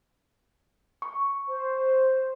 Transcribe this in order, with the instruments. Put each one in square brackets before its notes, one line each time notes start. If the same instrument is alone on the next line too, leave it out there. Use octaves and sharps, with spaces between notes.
[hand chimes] C#6
[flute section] C5